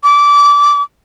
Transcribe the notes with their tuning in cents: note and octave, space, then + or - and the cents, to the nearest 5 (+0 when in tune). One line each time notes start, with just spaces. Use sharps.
D6 -20